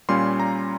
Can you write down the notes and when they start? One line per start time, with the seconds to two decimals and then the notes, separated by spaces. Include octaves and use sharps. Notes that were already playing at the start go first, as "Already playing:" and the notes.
0.09 A#2 G3 C#4 F4 C6
0.40 A#5